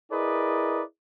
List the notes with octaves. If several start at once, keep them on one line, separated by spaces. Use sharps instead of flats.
E4 G#4 A#4 B4 D5 D#5